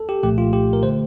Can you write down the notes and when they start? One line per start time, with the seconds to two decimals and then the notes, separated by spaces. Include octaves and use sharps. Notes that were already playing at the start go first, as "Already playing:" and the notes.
Already playing: A4
0.09 G4
0.23 C2 A#2 F3 A3 G4
0.38 F4
0.53 G4
0.73 A#4
0.83 D3 A3 C5